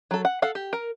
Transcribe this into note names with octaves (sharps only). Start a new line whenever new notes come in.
F#3 A4
F#5
A4 F5 F#5
G4
A#4